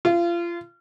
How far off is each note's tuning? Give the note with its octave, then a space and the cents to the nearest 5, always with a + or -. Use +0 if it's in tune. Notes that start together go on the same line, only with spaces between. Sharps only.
F4 -30